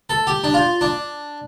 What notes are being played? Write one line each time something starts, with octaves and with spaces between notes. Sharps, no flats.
A4
G4
D4
F4
D4